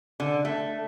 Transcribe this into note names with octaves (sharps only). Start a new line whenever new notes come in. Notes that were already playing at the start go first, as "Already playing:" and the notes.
D3
A3